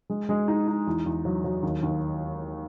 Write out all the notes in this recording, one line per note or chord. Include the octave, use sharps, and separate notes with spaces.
G#3
G#3
D#4
D#4
E2
E2
F#3
F#3
D#2
D#2